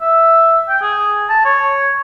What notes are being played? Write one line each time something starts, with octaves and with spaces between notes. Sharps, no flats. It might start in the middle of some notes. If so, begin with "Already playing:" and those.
E5
G5
G#4
A5
C#5